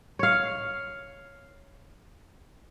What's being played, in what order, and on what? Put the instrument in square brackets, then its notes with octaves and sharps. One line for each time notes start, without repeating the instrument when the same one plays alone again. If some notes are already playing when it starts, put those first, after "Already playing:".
[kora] C#5 F5